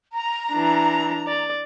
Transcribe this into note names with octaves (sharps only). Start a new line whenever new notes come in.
A#5
E3 D4
D5